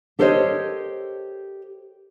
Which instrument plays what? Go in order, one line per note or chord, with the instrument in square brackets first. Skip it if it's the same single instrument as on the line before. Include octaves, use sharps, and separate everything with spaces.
[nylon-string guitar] G4 A4 A#4 C5 C#5 D#5